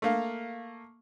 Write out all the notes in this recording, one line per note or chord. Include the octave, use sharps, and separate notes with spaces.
A3 A#3 F5